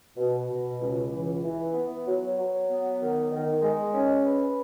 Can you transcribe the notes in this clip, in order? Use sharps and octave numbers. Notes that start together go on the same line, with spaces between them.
B2
B2
C#2
E3
E3
B3
F#3
F#3
B3
D#3
D#3
G#3
C#4
B4